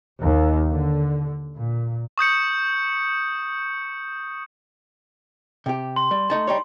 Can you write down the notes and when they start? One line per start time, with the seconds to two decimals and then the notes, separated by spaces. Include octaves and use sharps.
0.21 D#2
0.71 D3
1.56 A#2
2.18 C#6 D#6 G6 C#7
5.66 C3 G4
5.96 C6
6.11 G3
6.30 A3 D#4 A5
6.47 G3 D#4 C#5